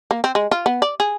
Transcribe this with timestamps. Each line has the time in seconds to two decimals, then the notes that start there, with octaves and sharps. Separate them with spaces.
0.11 A#3
0.24 C4
0.35 G#3
0.51 F4
0.66 B3
0.82 D5
1.00 G#4